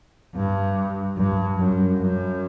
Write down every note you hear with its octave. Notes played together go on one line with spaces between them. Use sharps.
G2
G2
F#2
F#2